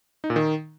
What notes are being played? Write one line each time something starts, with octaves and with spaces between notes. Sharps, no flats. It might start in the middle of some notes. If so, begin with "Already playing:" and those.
D#4
A#2
D#3